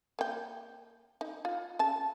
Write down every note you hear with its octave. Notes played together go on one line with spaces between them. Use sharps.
A#3 G5
D#4
F4
C#3 A5